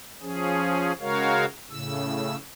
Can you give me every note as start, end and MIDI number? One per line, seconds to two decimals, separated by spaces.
0.22 0.92 53
0.22 0.92 61
0.22 0.92 68
1.01 1.45 49
1.01 1.45 56
1.01 1.45 66
1.01 1.45 70
1.01 1.45 73
1.01 1.45 77
1.70 2.36 45
1.70 2.36 49
1.70 2.36 88